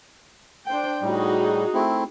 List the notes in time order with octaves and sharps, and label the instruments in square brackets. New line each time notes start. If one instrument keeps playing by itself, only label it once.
[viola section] D4 C5 G5
[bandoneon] A2 G3 [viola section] D#4 F#4 G#4
[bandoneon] A3 C4 E4